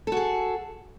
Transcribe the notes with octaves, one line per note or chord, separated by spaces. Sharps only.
F#4 G#4 A4